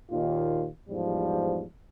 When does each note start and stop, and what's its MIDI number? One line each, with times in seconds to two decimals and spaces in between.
0.11 0.68 39
0.11 0.68 46
0.11 0.68 51
0.11 0.68 65
0.89 1.65 40
0.89 1.65 44
0.89 1.65 53
0.89 1.65 55